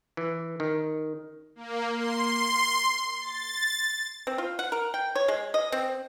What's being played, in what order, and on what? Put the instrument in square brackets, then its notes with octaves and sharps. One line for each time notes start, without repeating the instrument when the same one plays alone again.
[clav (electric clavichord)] E3
D#3
[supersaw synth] A#3
C6
A6
[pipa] C4
F4
F#5
A#4
G5
C#5
G#3
D#5
C4